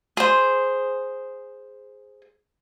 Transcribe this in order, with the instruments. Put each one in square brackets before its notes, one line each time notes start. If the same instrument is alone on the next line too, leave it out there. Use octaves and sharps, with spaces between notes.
[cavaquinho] G#4 C5